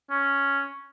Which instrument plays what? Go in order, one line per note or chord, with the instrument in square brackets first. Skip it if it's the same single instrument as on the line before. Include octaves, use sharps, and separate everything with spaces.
[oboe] C#4